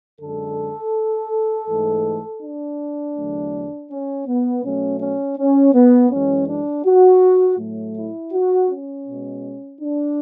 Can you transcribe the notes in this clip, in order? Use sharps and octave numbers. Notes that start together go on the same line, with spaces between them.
F#2 D3 G#3 A4
G#2 E3 A3
D4
E2 D3 F#3 A3
C#4
B3
B2 F#3 A3 C#4
C#4
C#4
B3
F#2 E3 G#3 C#4
D4
F#4
A2 F#3 A3
E4
F#4
C#4
B2 G#3
D4